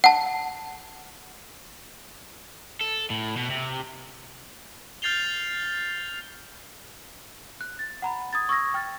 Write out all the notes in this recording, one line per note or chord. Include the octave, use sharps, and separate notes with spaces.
F#5 A5
A4
A2
B2
C3
F6 G6 A6 C7 F7 G7
F#6
A6
F#5 A#5 B5
D#6 G#6 A6
C#6 D#6 E6 G#6 A#6
G5 F6 A6